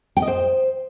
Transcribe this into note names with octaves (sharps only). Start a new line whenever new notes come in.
G5
D#5
C5